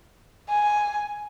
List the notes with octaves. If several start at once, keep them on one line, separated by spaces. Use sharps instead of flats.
G#5